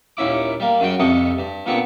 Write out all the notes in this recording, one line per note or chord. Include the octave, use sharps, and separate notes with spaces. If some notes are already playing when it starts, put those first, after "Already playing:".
D#2 A#2 C#4 E4 D6
G3 A#3
F#2 C#3 F#4 G5
C2 F2 C3 A4 D#5 C#6
G2
A#2 D3 B3 C4 C#6